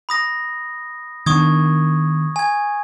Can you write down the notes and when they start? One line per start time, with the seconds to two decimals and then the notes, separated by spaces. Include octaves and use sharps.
0.09 B5 D#6 A#6
1.26 D#3 B3 D4 C#6 D#6 G#6
2.36 G#5 G#6